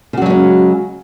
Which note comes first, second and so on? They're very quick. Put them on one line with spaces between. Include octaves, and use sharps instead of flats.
C#3 F#4 F#3 G#3 C#4